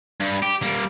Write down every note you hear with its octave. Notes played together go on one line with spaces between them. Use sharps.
G2
G4
G3 A#3